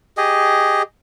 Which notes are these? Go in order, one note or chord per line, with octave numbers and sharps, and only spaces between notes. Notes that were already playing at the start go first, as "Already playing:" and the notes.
G4 G#4 D#5